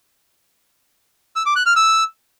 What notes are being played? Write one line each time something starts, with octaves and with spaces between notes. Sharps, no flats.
E6
D6
F#6
F6
E6